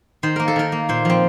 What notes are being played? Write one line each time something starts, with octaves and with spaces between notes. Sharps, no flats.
D#3 C5
A#3 A#4
A4
D#3 A#4
A#3
A#2 C5
F3 C4